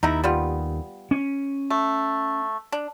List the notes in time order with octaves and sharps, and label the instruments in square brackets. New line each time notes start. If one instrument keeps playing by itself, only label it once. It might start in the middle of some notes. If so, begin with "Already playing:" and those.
[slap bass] D#2 [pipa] D#4 E4 A#5
[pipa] G3 B3 F4
[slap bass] C#4
[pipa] A3
D4